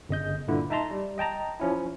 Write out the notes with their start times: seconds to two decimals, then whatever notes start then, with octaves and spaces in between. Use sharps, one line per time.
0.09 G1 C#3 D#5 G6
0.48 G2 A#2 D3 E4
0.70 D#4 E5 A5 A#5 C6
0.91 G3
1.18 D#5 G5 A5 A#5
1.60 F3 C#4 E4